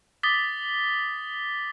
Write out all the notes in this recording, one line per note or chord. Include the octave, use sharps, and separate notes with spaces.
D6 D#6 A6 B6 G7